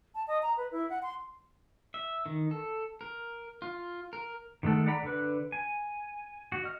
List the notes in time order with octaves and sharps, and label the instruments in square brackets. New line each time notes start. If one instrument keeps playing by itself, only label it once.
[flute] A5
D#5
A#5
B4
E4
F#5
C6
[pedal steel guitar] E5
D#3
A4
A#4
F4
A#4
D#3 G#3 A3 A4 F#5
D5 F#5 A#5 B5
D3 B4
G#5
F#4
D#5 F6